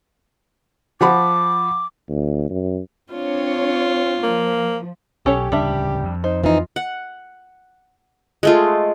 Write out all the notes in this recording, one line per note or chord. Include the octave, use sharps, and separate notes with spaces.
F3 F#5 B5 D6
D2
F#2
C4 D4 F4 C#5
F3 A#3
B1 C#4 G4 A4 C#5
D1 C#3 G3 D4 E5
F2
D#4 C5
E3 D#4 F4
F#5
G#3 A3 F4